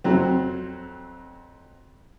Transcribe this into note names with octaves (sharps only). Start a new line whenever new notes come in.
F2 F#3 C4